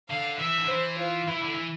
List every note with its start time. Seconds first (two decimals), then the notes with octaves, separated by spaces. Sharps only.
0.09 D3 F5
0.38 E3 E5
0.58 D3
0.68 E3 C5
0.98 F4
1.28 E3 E4
1.42 D3
1.54 E3